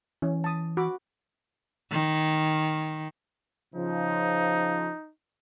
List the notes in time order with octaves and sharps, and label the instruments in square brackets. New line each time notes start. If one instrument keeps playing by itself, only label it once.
[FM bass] E3 [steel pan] C#4
[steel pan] A5 D#6
F#4 B5 D6
[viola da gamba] D#3
[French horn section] C#3 F3 [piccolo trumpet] D#4